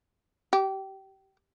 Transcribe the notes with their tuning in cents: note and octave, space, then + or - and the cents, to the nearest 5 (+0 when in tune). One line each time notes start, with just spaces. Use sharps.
G4 -25